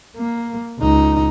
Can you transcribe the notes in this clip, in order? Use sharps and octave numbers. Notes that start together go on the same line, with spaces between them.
A#3
C#2 D#4